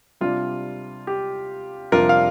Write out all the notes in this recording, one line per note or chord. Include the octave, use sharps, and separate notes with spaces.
C3 G3 D4 F4
G4
F2 C3 G3 D4 F4 A#4
F5